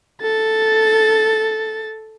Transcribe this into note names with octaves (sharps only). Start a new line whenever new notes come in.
A4 A6